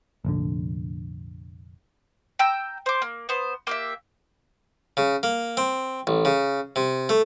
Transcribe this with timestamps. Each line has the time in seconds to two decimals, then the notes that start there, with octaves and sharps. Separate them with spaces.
0.25 F1 A#1 D3
2.39 G5 A#5 E6 G6
2.86 C5 D6
3.02 A#3
3.29 B3 C5
3.67 A#3 G4 E5
4.97 C#3
5.23 A#3
5.57 C4
6.07 A1
6.25 C#3
6.76 C3
7.09 A3